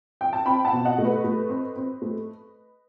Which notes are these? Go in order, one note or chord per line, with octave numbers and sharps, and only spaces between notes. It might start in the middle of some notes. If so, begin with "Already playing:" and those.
G5
A5
C4 G5 B5
F#5 A5
B2
D#5 F#5
A3
B4 D#5
A3
C4
C4
A3